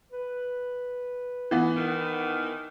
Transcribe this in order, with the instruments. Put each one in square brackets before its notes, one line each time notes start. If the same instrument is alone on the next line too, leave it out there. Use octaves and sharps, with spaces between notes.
[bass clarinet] B4
[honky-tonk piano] E3 B3
[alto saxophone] D#3